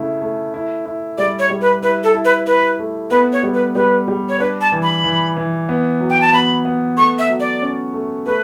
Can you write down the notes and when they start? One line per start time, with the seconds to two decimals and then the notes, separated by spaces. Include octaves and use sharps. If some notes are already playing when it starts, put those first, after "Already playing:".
Already playing: C#3 A3 E4
0.21 A3
0.54 E4
0.86 E4
1.18 G3 D5
1.39 C#5
1.50 G3
1.61 B4
1.82 E4 B4
2.04 A4
2.14 E4
2.25 B4
2.47 E4 B4
2.79 A3
3.11 B3 B4
3.33 C#5
3.43 G3
3.54 B4
3.75 G3 B4
4.08 G3
4.29 C#5
4.40 D4 B4
4.61 A5
4.72 E3
4.83 B5
5.04 E3
5.36 E3
5.69 B3
6.00 F#3
6.10 G5
6.21 A5
6.33 B3 B5
6.65 B3
6.97 A3 C#6
7.19 E5
7.29 F#3
7.40 D5
7.62 C#4
7.93 A3
8.26 A3 B4